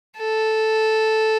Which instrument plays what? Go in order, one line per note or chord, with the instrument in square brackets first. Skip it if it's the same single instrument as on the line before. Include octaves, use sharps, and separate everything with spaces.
[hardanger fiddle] A4